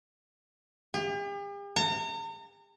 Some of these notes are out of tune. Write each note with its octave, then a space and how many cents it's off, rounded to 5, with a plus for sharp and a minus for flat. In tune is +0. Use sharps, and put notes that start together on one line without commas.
G4 +45
A#5 -40